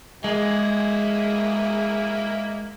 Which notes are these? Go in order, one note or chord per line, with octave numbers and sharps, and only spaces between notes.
G#3 A#3 E4 G#4